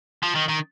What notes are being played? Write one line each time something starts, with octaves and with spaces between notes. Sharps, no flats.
F3
D#3
D#3